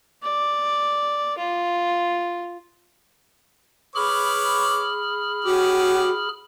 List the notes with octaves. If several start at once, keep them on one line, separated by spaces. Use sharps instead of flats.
D5
F4
G#4 B4 C#5 B5 D6 F6
C#4 F#4 G4